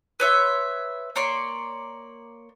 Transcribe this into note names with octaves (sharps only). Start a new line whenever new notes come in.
B4 C#5 E5 C6
A#3 C#5 D5 C6